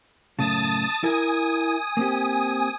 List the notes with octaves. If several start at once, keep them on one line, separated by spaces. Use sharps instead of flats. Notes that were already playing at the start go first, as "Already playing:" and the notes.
F#2 A2 C#3 A5 D#6 A6
E4 A#4 G#5 D#6
A#3 C4 G4